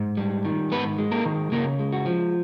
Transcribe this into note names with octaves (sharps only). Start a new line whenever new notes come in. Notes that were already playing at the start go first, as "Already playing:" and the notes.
Already playing: G#2
G3
D#3
G#2 B3 B4
G#3
A#3 A#4
D#3
C#3 A#3 A#4
G#3
F#4
F3